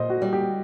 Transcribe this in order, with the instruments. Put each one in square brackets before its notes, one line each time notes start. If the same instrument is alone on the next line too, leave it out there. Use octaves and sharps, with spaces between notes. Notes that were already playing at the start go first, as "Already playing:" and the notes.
Already playing: [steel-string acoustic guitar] A#2 [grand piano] C5 D#5
[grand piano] F#4
[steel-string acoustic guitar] G3
[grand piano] G4